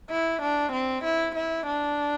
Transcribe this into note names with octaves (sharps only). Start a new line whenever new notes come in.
E4
D4
C4
E4
E4
D4